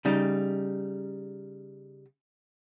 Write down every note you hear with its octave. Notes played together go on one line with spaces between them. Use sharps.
C#3 G3 D#4